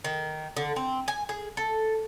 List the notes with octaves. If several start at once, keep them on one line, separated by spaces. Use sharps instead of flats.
D#3
D3
C4
G#5
G#4
A4